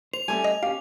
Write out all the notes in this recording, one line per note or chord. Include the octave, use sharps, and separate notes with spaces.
C5 F7
G3 A3 C#4 G#5
D#5
C#4 G4 F5